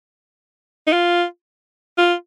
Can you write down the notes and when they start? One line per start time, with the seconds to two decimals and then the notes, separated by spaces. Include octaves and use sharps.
0.87 D#4
0.93 F4
1.98 F4